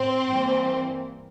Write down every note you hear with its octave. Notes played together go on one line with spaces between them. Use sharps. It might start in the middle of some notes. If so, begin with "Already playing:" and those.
Already playing: A2 C4
G2 E3 G3 A#3